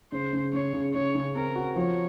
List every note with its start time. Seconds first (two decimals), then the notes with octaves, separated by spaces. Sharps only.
0.12 C#3 C5
0.33 C#3
0.53 C#3 C#5
0.73 C#3
0.94 C#3 C#5
1.15 C#3
1.35 C4 A#4
1.56 F#4
1.76 F3 C#5